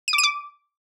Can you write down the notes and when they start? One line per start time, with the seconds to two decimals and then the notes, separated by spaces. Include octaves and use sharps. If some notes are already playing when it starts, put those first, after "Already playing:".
0.08 D#7
0.13 D6
0.18 D#7
0.23 D6